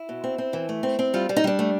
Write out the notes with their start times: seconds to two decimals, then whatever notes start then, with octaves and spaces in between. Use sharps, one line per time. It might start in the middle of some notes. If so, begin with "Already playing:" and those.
Already playing: E4
0.09 B2
0.24 C4
0.38 C4
0.53 E3
0.69 A3
0.83 C4
0.99 C4
1.14 G3 F4
1.29 G3
1.36 D#4
1.44 G3 D4
1.59 A3